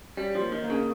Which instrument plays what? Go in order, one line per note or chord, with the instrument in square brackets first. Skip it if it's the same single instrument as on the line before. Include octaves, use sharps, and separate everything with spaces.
[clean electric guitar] G3 [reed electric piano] C#4
[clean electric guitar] F3
[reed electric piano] A#3
[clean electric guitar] D#3
[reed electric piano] A#3
[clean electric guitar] C#3